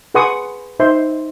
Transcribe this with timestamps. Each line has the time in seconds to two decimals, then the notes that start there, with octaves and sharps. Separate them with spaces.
0.14 G#4 B4 F#5 C6 C#6 D#6
0.80 D#4 C5 E5 C6